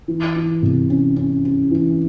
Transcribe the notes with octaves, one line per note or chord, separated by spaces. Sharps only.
E3
E3
C3
C#4
C#4
C#4
E3